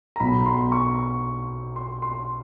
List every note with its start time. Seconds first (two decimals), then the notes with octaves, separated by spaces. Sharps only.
0.16 A#5
0.20 B1 B2 B5
0.46 C6
0.72 C#6
1.76 C6
2.02 C6